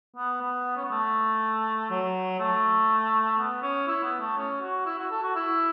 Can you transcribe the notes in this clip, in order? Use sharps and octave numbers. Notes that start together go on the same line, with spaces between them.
B3
B3
C#4
B3
A3
F#3
A3
B3
C#4
E4
B3
A3
C#4
F#4
E4
F#4
A4
F#4
E4